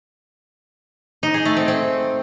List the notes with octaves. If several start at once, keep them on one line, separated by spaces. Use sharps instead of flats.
D#4
G#4
A3
C4
C4